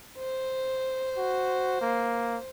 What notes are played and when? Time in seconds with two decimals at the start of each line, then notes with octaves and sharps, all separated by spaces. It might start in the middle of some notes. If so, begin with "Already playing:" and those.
0.18 C5
1.18 F#4
1.81 A#3